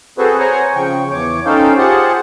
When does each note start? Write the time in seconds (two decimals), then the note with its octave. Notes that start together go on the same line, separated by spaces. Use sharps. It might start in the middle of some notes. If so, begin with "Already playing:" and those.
0.18 C4 F#4 G#4 A4 B4 C5
0.39 C5 C#5 F#5 G#5 A#5
0.75 C#3 F3 G5 C#6
1.11 E2 C#5 D6
1.46 C#4 D#4 A4 C5 F5 G5
1.78 F4 G4 G#4 C5 F#5 A5